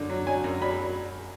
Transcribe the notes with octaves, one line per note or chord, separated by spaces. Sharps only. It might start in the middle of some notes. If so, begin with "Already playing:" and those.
Already playing: F#2 D3
F#3
F#3 G#5
F#2
F#3 B5